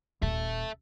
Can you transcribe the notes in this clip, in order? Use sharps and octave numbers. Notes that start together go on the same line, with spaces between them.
D#1 A4 E5